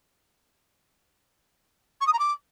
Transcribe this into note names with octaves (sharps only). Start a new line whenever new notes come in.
C#6
D#6
A#5
D6